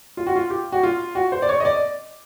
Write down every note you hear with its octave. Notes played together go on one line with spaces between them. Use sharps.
F4
F#4
F4
G4
F#4
F4
F#4
C5
D5
C#5
D#5
D5